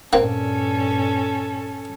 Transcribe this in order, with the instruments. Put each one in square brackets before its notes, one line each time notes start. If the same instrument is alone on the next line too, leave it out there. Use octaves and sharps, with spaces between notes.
[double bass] G2 A#2 [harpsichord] A#3 C4 [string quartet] C#4 A4